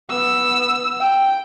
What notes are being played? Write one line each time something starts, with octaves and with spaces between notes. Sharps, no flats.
B3 E6
G5